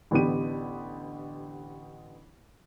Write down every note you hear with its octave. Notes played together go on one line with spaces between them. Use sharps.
A1 D3 B3 G4 D#7